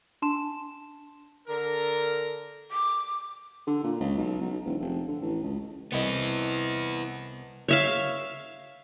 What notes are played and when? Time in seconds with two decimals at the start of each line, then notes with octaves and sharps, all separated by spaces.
0.22 D4 A5 C6 E7
1.48 D3 A#4
2.71 D6
3.67 D3
3.84 A#2
4.00 C#2
4.18 B1
4.41 B1
4.65 E1
4.80 F1
5.08 D3
5.21 A1
5.43 C#2
5.92 C2 B3 E4 D#5
7.68 C#5 E5 F5